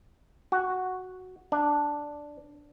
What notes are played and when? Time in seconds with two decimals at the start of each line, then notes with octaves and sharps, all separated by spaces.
0.52 F#4
1.52 D4